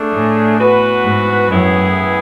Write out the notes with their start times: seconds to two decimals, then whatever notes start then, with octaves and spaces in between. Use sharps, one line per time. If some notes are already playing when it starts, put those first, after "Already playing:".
Already playing: A3 D4 G#4
0.13 A2
0.58 E3 B3 F#4 B4
1.03 G#2
1.49 F#2 A2 E3 B3 E4 G#4